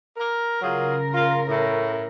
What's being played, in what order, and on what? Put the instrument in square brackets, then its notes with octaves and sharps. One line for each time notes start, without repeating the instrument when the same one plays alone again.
[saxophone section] A#4
[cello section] C#3 A#4 [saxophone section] F#3 F4 G#4
[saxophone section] F4
A2